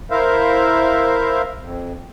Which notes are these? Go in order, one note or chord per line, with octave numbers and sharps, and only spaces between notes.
E4 A#4 C5 E5 F5
F2